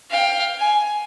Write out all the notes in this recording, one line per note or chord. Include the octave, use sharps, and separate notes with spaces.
F5 G5
G#5